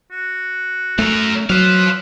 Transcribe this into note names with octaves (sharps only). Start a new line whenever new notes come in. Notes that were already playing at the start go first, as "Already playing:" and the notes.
F#4
F#2 A3 A#4
F#3 B4 C5 F5